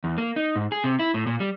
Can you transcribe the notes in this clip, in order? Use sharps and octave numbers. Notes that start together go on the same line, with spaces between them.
E2
A#3
D#4
G#2
G#4
C3
E4
A2
A#2
G3